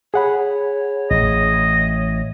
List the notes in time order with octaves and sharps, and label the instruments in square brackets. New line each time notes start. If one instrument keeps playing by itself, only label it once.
[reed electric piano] G#4 F#5 B5 [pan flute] C#5
[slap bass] A1 [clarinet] D#5